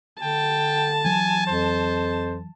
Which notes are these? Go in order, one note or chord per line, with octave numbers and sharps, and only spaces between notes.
D3 G5 A5
E3 F#3 G#5
F2 C5